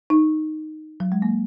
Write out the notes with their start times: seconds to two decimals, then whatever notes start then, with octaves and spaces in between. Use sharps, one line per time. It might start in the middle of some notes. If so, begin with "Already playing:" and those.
0.10 D#4
1.00 F#3
1.12 G#3
1.22 A#3